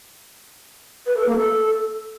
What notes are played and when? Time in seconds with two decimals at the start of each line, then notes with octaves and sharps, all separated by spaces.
1.06 B4
1.16 A4
1.26 A#3
1.36 A4